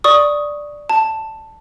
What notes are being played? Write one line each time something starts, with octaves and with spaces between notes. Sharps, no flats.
D5 C#6 D#6
A5